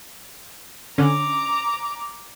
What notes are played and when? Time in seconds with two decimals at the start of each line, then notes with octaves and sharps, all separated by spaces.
0.98 D3 C#4 A#5 D6